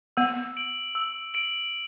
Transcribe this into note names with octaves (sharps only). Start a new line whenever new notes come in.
B3 E6
D7 F#7
E6
D7 F#7